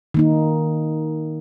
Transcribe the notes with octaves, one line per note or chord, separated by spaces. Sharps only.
D#3 A#3 D#4